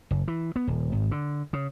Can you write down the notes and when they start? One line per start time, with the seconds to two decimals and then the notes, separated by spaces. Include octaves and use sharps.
0.11 F#1
0.28 E3
0.56 B3
0.67 D#1
0.92 G#1
1.11 D3
1.53 C#3